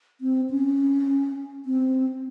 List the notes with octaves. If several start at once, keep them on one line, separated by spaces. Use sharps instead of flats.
C4
C#4
C4